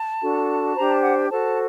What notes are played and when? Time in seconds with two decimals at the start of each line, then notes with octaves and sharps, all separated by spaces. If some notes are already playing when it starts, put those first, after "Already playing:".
Already playing: A5
0.21 D4 F#4 A4
0.75 D4 G4 C5 A#5
0.88 A5
1.02 F#5
1.16 G5
1.29 F#4 A4 C5 A5